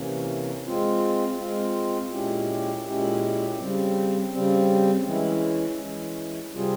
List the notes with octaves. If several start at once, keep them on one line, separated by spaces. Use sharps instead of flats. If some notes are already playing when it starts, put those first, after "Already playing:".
Already playing: C3 E3 A#3 C#4
G#3 C4 F4
G#3 C4 F4
A#2 G#3 C#4 E4 G4
A#2 G#3 C#4 E4 G4
C#3 G3 C4
C#3 G3 C4
E3 G#3 C#4 E4
E3 G#3 C#4 E4
C3 G3 C4 F4 G#4